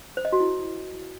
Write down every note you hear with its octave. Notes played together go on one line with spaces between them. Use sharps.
C5
D#5
F#4
E4